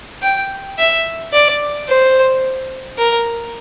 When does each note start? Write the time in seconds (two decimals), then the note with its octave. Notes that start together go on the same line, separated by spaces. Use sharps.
0.22 G5
0.78 E5
1.33 D5
1.88 C5
2.98 A#4